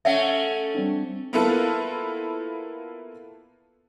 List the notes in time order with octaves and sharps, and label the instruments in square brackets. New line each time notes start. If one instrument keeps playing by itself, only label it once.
[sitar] A3 C#4 [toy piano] E5 F#5
[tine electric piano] G3 C4 D4
[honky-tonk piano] A#3 B3 E4 F4 A4 B4